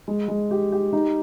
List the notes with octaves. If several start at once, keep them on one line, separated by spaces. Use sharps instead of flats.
G#3
G#3
G4
G4
D#4